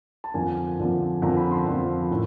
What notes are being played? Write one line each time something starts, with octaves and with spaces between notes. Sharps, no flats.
A5
F2 D3 F3 A#3 G#5
F2 D3 F3 A#3
F2 D3 F3 A#3 A#5
B5
C6
F2 D3 F3 A#3
A2